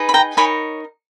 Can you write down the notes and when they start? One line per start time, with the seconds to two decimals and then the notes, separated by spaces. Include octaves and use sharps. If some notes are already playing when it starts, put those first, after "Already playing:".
Already playing: D#4 G#4 B4
0.09 B5
0.14 G5 A#5
0.37 D#4 A#4 C#5 G#5 B5